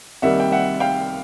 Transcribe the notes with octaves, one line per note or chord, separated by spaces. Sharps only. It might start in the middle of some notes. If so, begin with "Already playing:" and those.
C2 C3 D#3 G3 A#3 E5 F#5
G5
E5 F#5
F5 G5